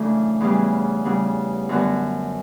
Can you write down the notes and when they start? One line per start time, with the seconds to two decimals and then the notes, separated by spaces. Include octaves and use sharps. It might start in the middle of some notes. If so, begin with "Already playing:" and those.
Already playing: F#2 C#3 E3 A3 D4
0.40 E2 C#3 E3 G3 B3
1.05 C#3 G3 B3 F#4
1.69 F#2 D3 G3 B3 F#4